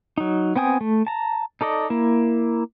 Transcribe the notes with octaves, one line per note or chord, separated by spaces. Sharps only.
F#3 D#4
B3 C4 G5 G#5 D#6
A3
A5 A#5
D#4 A4 D5 D#5
A#3 E4